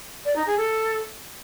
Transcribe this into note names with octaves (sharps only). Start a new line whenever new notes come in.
D5
D#4
G#4
A4